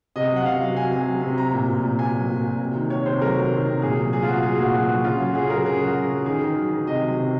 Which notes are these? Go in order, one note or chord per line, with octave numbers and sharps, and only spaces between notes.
C3 D#5
F#3
F#5
C3 F5
F#3
F#3 G#5
C3 G#5
F#3
C3
F#3 A#5
A#2
A#2
A#2
A#2 G#5
F#3
A#2
A#2
C3
D#3
C3 C#5
C3 C5
F#3 A#4
F#3
D#3
C3
A#2 G#4
F#3
F#3 G#4
F4
F#3 F#4
F#3 G#4
A#2 F#4
F#3 F#4
F#3 F#4
C#3 F4
F#3
F#4
C#3 G#4
F#3 A#4
C#3 G#4
F#3 F#4
F#3
C#3
D#3 G#4
D#3
F#3
D#3
C3 D#5
F#3
C3